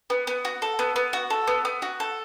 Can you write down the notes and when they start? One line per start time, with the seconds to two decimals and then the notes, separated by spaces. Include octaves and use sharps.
0.10 B3
0.27 B3
0.45 F#4
0.62 A4
0.79 B3
0.96 B3
1.13 F#4
1.30 A4
1.47 B3
1.65 B3
1.82 F#4
2.00 A4